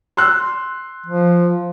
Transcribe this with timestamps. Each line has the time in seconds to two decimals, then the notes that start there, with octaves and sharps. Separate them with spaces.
0.17 C6 E6 F#6
1.06 F3